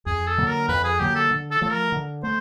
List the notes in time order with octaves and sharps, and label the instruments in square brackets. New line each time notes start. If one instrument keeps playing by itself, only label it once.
[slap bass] F2 [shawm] G#4
[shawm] A4
[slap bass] D3 F#3 A#3
[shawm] A#4
[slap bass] F2 [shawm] B4
[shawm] G#4
[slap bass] D3 F#3 A#3 [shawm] G4
[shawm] A4
[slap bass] D3
[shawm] A4
[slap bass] F3 A3 [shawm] A4
[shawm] A#4
[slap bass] D3
[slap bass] A3 [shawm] C5